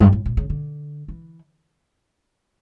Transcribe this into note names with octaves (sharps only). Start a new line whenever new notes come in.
G2
A2
A#2
C#3
D3
E3